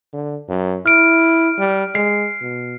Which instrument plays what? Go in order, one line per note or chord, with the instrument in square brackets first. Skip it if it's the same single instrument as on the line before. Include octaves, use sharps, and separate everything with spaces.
[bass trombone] D3
F#2
[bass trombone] E4 [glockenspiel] F6 D7
[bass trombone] G3
[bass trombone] G#3 [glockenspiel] C7
[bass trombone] B2